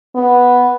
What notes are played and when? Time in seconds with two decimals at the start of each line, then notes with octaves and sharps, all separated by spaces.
0.16 B3